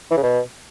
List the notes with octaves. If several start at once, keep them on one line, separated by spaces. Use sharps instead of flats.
E3
C#3
B2